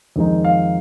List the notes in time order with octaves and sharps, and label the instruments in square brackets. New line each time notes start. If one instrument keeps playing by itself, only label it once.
[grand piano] F2 D#3 G#3 D#4
F5